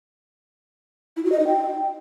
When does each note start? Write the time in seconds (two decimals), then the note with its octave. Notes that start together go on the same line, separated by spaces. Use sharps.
1.17 E4
1.24 F#4
1.32 D#5
1.40 D#4
1.47 G5